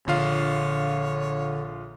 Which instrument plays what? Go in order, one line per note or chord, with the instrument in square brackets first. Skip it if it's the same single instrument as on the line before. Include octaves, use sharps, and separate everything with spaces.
[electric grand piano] A#1 F4 F5 [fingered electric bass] D3 [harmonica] C#5